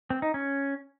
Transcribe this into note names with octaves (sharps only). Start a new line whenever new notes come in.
C4
D#4
C#4